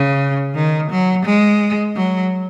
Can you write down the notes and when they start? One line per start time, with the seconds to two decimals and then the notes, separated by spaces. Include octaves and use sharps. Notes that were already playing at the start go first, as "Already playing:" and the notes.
Already playing: C#3
0.55 D#3
0.91 F#3
1.25 G#3
1.96 F#3